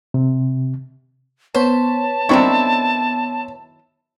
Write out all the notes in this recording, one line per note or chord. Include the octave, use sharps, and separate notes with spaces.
C3
B3 C5 C#5 A5
D#3 F#3 C4 D4 E4 C#6